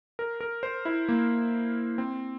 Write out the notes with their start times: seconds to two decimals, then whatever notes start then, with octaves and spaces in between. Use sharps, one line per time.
0.19 A#4
0.41 A#4
0.63 C5
0.85 E4
1.09 A#3
1.98 C4